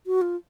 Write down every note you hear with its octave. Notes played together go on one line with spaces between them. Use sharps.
F#4
F4